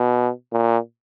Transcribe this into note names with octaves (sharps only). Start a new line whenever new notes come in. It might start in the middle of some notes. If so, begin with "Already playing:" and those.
Already playing: B2
A#2